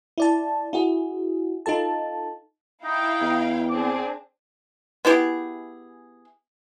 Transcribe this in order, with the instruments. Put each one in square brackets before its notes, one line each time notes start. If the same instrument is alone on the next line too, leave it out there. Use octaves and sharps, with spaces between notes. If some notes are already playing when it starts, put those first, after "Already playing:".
[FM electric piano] E4 D5 A5
E4 F#4 G#4
D#4 F4 A4 A5
[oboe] D#4 [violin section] E4 F5 G5
[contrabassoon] E2
[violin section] C4 D4 G#4 [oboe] D6
[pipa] B3 E4 G4 G#4